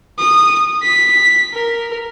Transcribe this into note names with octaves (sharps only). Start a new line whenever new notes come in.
D#6
B6
A#4